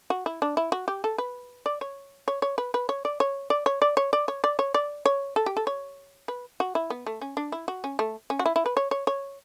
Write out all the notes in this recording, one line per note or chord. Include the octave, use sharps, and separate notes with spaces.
F#4
E4
D4
E4
F#4
G4
A4
B4
D5
C#5
C#5
C#5
B4
B4
C#5
D5
C#5
D5
C#5
D5
C#5
D5
C#5
D5
C#5
D5
C#5
A4
G4
A4
C#5
B4
F#4
E4
B3
A3
C#4
D4
E4
F#4
C#4
A3
C#4
F#4
E4
E4
B4
C#5
C#5
C#5